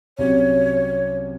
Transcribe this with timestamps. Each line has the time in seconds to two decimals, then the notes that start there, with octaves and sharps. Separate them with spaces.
0.18 C2 C3 F#3 C#4 C#5